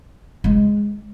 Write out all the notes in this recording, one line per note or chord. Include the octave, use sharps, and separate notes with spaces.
G#3